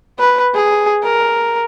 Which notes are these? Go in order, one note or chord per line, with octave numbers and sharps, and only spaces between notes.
B4
G#4
A#4